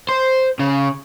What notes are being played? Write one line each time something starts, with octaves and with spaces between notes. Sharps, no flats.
C5
C#3